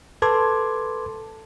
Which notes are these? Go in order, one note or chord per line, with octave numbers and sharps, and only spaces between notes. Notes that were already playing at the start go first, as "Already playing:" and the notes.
A4 B4 A5 C6 D6 G#6